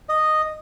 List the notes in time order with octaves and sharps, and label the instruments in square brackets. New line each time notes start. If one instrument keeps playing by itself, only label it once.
[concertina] D#5